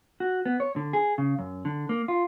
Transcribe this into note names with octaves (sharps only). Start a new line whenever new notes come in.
F#4
B3
C#5
D3
G#4
C#3
F#2
D3
A#3
F4